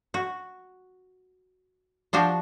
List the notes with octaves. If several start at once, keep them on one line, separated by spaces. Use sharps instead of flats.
F#4
F3 D4 F#4 G4